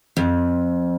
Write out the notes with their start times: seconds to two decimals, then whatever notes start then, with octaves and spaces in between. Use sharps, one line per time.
0.17 F2